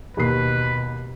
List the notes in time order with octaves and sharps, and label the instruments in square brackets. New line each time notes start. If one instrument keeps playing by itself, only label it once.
[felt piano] D#2 C7 [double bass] B2 [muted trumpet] B4